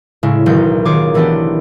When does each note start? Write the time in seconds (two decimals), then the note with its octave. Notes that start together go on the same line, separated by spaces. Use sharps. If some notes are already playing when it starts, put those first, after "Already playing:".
0.23 A2 C#3 G#3 E4
0.46 E1 B1 D#3 D#4 G6
0.85 D#3 F4 G#4 C#5 D6
1.14 D#3 E3 A3 B3 D4 G4